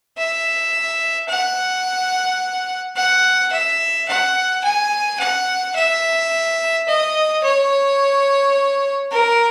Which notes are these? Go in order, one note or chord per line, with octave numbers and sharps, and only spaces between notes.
E5
F#5
F#5
E5
F#5
G#5
F#5
E5
D#5
C#5
A#4